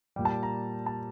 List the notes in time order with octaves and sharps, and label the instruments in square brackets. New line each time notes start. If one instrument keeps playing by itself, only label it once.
[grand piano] G3 G5
A#2
A5
A#5
A5